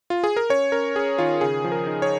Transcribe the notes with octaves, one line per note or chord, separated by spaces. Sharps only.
F4
G#4
A#4
C#4 C#5
C#4 A#4
C#4 G#4
D#3 F4
C#3 G#4
F3
A#4
D#4
C#5